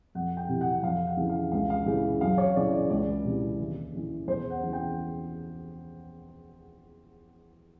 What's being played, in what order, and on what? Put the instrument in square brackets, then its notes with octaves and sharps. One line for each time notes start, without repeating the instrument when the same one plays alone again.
[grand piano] F2 F#5
G5
C3 E3
F#5
F2 F5
F#5
C#3 E3
F5
C#2 F5
F5
C#3 E3
F#2 F5
C#5
C#3 E3 D5
D5
C#2 D5
C3 E3
D#2
C#3 E3
E2 C5
F#5
C#3 E3
G5